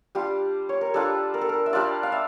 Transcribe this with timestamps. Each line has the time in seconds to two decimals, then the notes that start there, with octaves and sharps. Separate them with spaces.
0.15 G3 D4 F4 G4
0.69 C#5
0.81 A#4
0.94 G3 D4 F4 A4
1.34 A#4
1.41 A4
1.49 A#4
1.66 E5
1.73 G3 D4 F4 D5
2.03 F5
2.12 E5